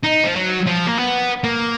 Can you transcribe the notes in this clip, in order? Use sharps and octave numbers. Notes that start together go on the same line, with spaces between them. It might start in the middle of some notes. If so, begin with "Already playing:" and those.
D#4
F3
F#3
F3
A#3
B3
A#3